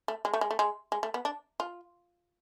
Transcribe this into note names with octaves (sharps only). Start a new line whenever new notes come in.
A3
G#3
A3
G#3
A3
G#3
G#3
A3
B3
D4
F4